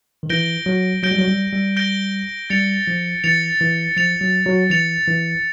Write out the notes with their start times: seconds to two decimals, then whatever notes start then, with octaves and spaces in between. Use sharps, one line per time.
0.23 D#3
0.30 E3 G6 A#6 D7 G7
0.66 F#3
1.03 F#3 G6 A#6 D7 G7
1.11 G3
1.19 F#3
1.28 G3
1.53 G3
1.77 G6 A#6 D7 G7
2.50 G3 A6 C#7 F7
2.87 F3
3.24 E3 A6 C#7 F7
3.61 E3
3.97 F3 A6 C#7 F7
4.21 F#3
4.46 F#3
4.70 E3 A6 C#7 F7
5.08 E3